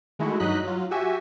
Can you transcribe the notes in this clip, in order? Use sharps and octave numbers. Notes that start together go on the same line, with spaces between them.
D#3 G#3 A3 E4 F#4
G2 F#3 D#4 D#5 F#6 B6
F#3 F4
F#4 G4 E5 G#5